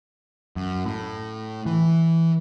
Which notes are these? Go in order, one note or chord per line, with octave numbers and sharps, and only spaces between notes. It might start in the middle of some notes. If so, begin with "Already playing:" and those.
F#2
A2
E3